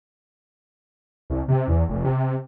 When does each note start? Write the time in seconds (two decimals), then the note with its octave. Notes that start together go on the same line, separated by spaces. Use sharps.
1.30 C2
1.48 C3
1.67 E2
1.89 F1
2.05 C3